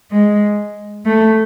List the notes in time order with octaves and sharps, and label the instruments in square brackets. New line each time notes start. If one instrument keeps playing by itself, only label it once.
[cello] G#3
A3